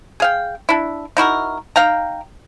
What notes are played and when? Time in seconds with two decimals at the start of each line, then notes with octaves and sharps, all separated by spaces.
0.20 G#4 F5 G5
0.69 D4 E4
1.17 D#4 E4 F#4 A#4
1.76 D#4 F5 G5 A#5